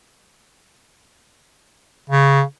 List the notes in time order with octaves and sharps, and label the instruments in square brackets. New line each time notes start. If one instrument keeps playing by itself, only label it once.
[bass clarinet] C#3